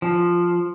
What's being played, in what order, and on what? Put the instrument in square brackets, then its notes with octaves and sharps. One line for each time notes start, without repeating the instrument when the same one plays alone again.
[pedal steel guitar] F3